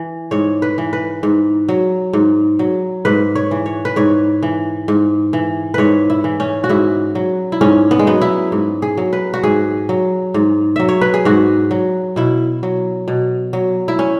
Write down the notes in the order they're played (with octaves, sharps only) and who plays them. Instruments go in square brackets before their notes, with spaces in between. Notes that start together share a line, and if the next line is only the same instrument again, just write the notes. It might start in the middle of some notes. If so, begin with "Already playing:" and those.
Already playing: [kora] E3
G#2 C#5
B4
E3
B4
G#2
F#3
G#2
F#3
G#2 B4
C#5
E3
C#5
B4
G#2 C#5
E3
G#2
E3
G#2 B4 C#5
E4
E3
C#4
F#4
G#2 E4
F#3
E4
G#2 C#4
B3
G#3
F#3 B3
E4
G#2
G#4
F#3
B4
F#4
G#2 G#4
F#3
G#2
F#3 E5
C#5
B4
G#4
G#2 F#4
F#3
B2 E4
F#3
B2
F#3
E4
C#4